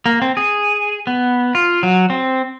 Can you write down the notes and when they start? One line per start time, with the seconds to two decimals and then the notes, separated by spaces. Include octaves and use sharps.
0.06 A#3
0.22 C4
0.37 G#4
1.07 B3
1.55 F4
1.83 F#3
2.10 C4